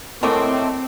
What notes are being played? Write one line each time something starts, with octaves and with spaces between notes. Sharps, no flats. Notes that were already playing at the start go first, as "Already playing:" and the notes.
A2 F#3 G#3 A3 C4 A#4 A5 D6